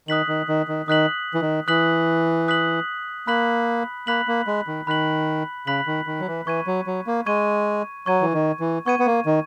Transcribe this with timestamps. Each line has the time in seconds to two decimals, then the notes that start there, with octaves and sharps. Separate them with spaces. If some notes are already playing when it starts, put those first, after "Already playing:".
0.08 D#3 D#6 F#6 B6 F#7
0.28 D#3
0.48 D#3
0.68 D#3
0.88 D#3 D#6 F#6 B6 F#7
1.34 E3
1.41 D#3
1.68 E3 D#6 F#6 B6 F#7
2.48 D#6 F#6 B6 F#7
3.27 A#3 B5 F#6 B6 F#7
4.07 A#3 B5 F#6 B6 F#7
4.28 A#3
4.47 G#3
4.67 D#3
4.87 D#3 B5 F#6 B6 F#7
5.67 C#3 B5 F#6 B6 F#7
5.87 D#3
6.07 D#3
6.20 F#3
6.27 E3
6.47 E3 C#6 G#6 D#7
6.67 F#3
6.87 F#3
7.07 A#3
7.26 G#3 C#6 G#6 D#7
8.06 F#3 C#6 G#6 D#7
8.21 E3
8.33 D#3
8.60 E3
8.86 B3 C#6 G#6 D#7
8.99 B3
9.06 A#3
9.26 D#3